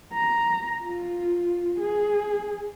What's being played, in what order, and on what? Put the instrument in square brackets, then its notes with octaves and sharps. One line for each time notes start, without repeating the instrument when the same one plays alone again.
[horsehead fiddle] A#5
F4
G#4